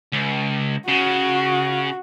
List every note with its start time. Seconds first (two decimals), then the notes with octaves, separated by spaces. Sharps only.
0.13 C#2
0.88 C#3 F#4